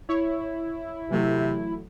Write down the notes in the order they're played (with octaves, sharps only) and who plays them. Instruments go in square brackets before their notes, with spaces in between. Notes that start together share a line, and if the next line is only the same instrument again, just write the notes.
[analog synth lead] E4 [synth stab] C#5
[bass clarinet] C3 [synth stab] E3 F#3 A3